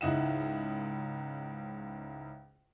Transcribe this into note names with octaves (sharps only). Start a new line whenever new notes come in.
C#2 G#2 E4 D#5 F#5 E7